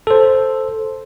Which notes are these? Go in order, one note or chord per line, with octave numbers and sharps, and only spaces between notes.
A4 C5